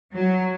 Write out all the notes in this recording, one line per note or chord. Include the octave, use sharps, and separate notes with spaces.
F#3